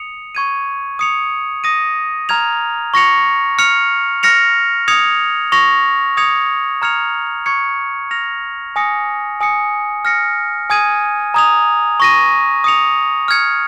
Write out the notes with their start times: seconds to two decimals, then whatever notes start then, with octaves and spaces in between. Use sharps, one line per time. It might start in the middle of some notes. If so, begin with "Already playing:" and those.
Already playing: D#6 C#7 F7
0.35 C#6 G#6 D#7
0.99 D#6 C#7 F7
1.64 D#6 A#6 D#7
2.29 A#5 F6 G#6 F7
2.94 C#6 A#6 C#7 F7
3.59 F6 C#7 F7
4.23 F6 A#6 C#7 F7
4.88 D#6 G#6 C#7 F7
5.52 C#6 A#6 F7
6.17 D#6 G#6 C#7 F7
6.82 A#5 F6 G#6 C#7 F7
7.46 C#6 G#6 C#7
8.11 F6 A#6 F7
8.76 G#5 D#6 A#6 C#7
9.41 G#5 D#6 C#7
10.05 F6 A#6 C#7
10.70 G#5 D#6 G#6 D#7
11.34 A#5 D#6 G#6 F7
12.00 C#6 A#6 D#7
12.64 D#6 C#7 F7
13.28 F6 G#6 C#7